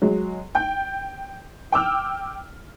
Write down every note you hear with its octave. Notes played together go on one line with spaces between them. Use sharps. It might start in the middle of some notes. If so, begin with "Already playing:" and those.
F#3 G#3
G5 G6
G5 D6 E6 F6